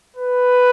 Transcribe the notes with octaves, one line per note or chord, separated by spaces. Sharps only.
B4